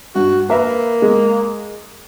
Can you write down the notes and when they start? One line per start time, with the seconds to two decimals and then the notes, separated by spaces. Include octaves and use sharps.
0.15 G2 F#4
0.50 A#3 A#4 B4 E5
1.02 G#3